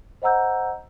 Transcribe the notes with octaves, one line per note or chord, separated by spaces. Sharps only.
C5 D#5 F#5 A#5 E6 G6